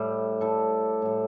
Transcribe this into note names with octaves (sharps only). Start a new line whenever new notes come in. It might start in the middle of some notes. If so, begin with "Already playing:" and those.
Already playing: A2 G3 A4
A2 G3 A4
A2 G3